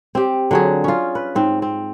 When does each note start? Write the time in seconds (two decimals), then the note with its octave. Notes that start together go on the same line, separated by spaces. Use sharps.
0.15 C4 G4
0.51 D3 F#3 G#4
0.84 C#4 F4
1.15 B4
1.35 G#2 C4
1.62 C4